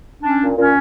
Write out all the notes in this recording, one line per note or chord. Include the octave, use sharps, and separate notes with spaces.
C#4 D4
A#2
A#2 C#4